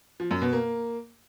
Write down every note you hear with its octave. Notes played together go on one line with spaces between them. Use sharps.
F3
F#2
B2
A#3